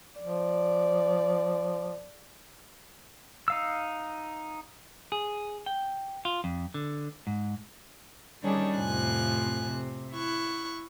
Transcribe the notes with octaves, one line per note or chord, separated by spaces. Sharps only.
F3 D5
D#4 F5 E6
G#4
G5
F4
F2
D3
G#2
D#3 G3 C#4 D4 G#4 C#5
F2 A2 C3 F3 G#5 F#6
C3
E4 C#6 F#6